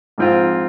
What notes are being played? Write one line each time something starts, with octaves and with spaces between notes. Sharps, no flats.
G#2 F3 C4 F4